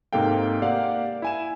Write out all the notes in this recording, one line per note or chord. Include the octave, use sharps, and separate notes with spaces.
G#2 C3 A#3 A4 F5 G5
A#3 G4 D5 F5 F#5
E4 G#5 E7